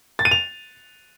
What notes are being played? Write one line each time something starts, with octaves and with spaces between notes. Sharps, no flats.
A6
D#7
F7